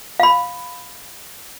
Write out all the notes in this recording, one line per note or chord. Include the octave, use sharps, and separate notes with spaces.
F5 B5